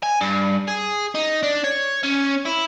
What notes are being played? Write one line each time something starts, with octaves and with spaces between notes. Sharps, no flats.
G#5
G2
G#4
D#4
D4
C#5
C#4
E4